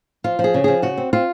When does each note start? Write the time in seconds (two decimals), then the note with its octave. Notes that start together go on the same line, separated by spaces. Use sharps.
0.24 F3 F4
0.39 F3
0.44 G#4
0.54 C#3
0.64 F3 G#4
0.82 C#3 F#4
0.98 C4
1.13 C4 F4